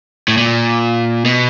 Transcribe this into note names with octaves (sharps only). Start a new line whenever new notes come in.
A2
A#2
B2